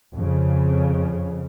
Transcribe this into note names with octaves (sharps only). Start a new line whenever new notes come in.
F2 C#3